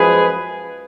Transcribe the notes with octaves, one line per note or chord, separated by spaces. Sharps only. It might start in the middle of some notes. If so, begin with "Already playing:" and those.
Already playing: F#2 F3 G#3 G#4 B4